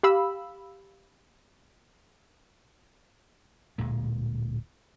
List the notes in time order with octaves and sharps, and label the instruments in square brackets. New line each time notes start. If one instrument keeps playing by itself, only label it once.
[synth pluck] G4 F5 B5 E6
[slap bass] D1 A#2 G#3